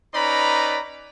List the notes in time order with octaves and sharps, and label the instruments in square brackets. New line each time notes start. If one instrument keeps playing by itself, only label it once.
[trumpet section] C#4 D#4 B4 D5 A#5 B5